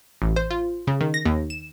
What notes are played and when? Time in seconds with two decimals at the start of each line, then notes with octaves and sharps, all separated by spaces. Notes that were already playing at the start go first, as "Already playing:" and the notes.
0.22 A1
0.36 C5
0.51 F4
0.87 C#3
1.01 D#3
1.14 A#6
1.25 D#2
1.50 E7